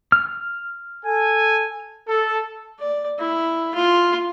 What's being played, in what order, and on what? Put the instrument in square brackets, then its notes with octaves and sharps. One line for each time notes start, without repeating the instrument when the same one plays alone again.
[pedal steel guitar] F6
[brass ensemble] A4 G#5
A4
[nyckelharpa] D5
E4
F4